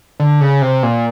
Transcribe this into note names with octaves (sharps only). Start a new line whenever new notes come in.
D3
C#3
C3
A#2